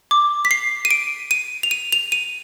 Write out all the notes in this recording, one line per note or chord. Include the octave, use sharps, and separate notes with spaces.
D6
B6
C7
D#7
D7
D#7
F7
D#7
F7
D#7